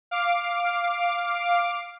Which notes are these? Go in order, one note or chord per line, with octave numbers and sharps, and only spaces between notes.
F5 D6